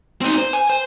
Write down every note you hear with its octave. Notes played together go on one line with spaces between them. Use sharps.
C4 D#4
C5
G#5
C5